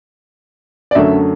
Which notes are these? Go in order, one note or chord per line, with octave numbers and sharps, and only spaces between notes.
D5
F#2 D3 F#3 A3 E5